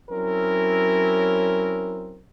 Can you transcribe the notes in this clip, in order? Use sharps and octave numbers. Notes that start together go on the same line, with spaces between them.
F#3 C4 C#4 E4 A#4